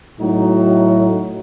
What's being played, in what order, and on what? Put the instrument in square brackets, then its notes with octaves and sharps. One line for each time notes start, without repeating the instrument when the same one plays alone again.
[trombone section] A2 F#3 D#4 F#4